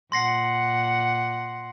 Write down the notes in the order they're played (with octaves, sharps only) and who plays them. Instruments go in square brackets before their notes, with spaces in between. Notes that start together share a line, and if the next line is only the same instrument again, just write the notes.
[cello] A#2 F#5 [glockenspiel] C6 A#6 C7